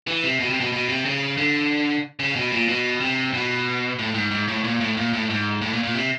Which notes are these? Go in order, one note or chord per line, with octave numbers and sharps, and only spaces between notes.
E3
C3
B2
C3
B2
B2
C3
C#3
D3
C#3
B2
A#2
B2
C3
B2
A2
G#2
G#2
A2
A#2
A2
A#2
A2
G#2
A2
A#2
A#2
C3